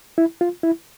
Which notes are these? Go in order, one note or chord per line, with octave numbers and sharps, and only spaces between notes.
E4
F4
E4